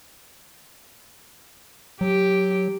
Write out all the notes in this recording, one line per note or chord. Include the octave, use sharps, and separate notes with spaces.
F#3 G4